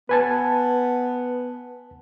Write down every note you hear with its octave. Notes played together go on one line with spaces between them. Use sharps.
B3 B4 G#5 A5